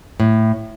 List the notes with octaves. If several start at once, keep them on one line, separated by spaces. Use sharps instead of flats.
A2